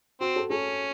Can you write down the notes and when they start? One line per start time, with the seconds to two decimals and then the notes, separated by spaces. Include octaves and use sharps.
0.21 C4 F#4
0.36 A4
0.50 C#4 A4